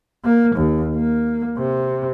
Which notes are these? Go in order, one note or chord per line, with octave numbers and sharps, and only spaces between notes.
A#3
D#2
A#3
C3